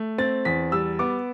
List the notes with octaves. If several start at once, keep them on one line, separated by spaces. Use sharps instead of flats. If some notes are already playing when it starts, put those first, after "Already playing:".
Already playing: A3
C4 A6
E2 B6
G3 E6
B3 D6